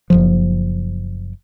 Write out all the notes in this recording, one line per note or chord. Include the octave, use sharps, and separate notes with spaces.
F#1 C2 F3